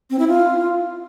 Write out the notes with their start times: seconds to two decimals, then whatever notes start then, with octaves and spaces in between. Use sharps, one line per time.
0.10 C4
0.19 E4
0.28 F4